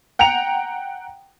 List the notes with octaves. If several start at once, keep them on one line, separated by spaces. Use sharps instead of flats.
F#5 G5 A#5 C#7 F7